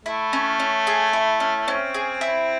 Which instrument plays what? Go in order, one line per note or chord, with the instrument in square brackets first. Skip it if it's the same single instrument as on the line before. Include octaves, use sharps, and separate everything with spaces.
[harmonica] A3 [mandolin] E4
[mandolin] C#4
C#4
G#4
E4
C#4
[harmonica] C4 [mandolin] C#4
[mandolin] G#4
E4